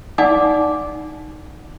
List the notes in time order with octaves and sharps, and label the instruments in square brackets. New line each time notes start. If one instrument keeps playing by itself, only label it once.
[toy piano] D#4 D5 F#5 G#5 D6